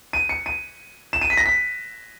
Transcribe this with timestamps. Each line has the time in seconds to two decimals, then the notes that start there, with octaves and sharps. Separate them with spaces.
0.13 D#7
0.29 C#7
0.46 D#7
1.13 E7
1.21 D#7
1.30 B6
1.37 A#6
1.46 B6